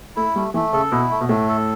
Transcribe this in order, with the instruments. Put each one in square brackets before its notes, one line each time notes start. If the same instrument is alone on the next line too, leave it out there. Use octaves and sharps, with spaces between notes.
[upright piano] A3 [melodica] E4
[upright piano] G3 [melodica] A3
[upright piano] E3 [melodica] A3
[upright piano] C#3 [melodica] A4
[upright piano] B2 [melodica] E4
[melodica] A3
[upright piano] B2
[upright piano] A2 [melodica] A3
[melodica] A4